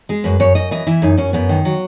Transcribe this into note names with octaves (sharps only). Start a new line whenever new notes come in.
G#3 G#4
F#2 B4
F#2 C#5
F#2 D#5
E3 D#5
E3 E4
F#2 D#4
F#2 C#4
F#2 B3
D#3
F#3